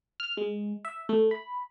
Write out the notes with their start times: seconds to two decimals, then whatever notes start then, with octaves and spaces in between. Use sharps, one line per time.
0.20 F6
0.37 G#3
0.85 E5
1.09 A3
1.31 B5